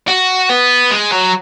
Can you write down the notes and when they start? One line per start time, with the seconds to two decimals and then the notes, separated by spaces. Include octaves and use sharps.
0.08 F#4
0.50 B3
0.91 G#3
1.11 F#3